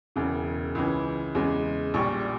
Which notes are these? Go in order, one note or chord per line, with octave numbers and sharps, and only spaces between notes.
E1 E2 C#3
C#2 C#3 E3
E2 C#3 G#3
A#1 A#2 G3 C#6